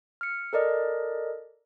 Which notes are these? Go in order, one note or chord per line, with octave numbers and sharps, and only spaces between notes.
F6 C#7
A4 A#4 D5 D#5